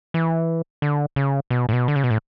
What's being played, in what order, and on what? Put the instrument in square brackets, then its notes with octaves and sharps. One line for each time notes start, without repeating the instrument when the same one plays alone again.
[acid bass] E3
D3
C#3
B2
A2
B2
D3
C#3
B2
A2